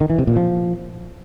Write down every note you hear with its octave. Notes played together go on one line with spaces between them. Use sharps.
D#3
E3
C3
A#2
F3